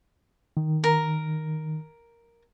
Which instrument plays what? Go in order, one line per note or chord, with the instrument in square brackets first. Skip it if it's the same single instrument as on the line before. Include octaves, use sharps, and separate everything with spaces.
[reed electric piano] D#3
[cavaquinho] A#4